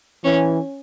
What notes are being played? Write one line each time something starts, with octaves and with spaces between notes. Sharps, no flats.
E3 C#4